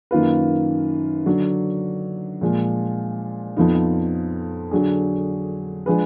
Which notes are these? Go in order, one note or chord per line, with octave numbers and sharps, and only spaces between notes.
F#2 D#3 A#3 F4 B4
D3 F#3 D4
A#2 F3 G#3
F2 F3 B3 D#4
D3 F#3 D4 G#4
F3 G#3 D4 G#4 B4